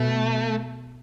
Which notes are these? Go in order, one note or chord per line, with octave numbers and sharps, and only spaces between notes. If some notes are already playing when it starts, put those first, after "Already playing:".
Already playing: B2 A3